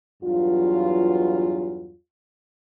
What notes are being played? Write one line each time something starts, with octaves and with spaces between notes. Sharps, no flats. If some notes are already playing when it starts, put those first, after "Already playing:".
E2 G2 F#3 F4